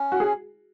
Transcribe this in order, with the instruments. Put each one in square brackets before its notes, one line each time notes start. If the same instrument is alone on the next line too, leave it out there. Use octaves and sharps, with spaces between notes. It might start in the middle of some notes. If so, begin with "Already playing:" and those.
Already playing: [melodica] C#4
[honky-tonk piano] F#4
G#4